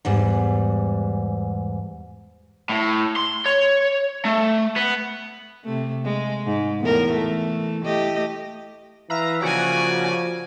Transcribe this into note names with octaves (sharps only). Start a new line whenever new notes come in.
E2 G#2 G3
A2
C6
C#5
A3
B3
C3 A3
G#3
G#2
E2 A2 A#4
E3 A3
A3 G4 D#5
E3 B4 E5 F5 A#5
C#3 F3 A#3 C#4 F#4 D5 G#5